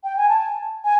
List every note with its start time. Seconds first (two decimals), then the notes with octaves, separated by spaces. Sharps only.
0.04 G5
0.17 G#5
0.29 A5
0.84 G#5